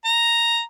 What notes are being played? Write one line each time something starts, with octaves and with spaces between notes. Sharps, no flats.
A#5